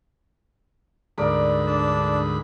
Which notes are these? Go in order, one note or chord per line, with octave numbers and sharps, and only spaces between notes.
D2 G#2 A#4 D5 B5
D4 A5